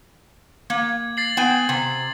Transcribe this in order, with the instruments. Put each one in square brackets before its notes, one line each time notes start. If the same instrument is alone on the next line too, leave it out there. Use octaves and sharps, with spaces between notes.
[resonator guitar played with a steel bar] A#3 [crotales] G#6
[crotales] A6 C7 F#7
[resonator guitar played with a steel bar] B3 G5 G#5
C3